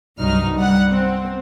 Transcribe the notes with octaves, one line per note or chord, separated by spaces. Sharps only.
C2 G2 F#3 D#4 F6
G3 F#5
C4